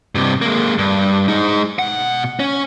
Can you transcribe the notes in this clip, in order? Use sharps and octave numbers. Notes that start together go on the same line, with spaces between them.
G2 C3
G#3 A#3
G2
G#3 D#4
B2 F#5
C#4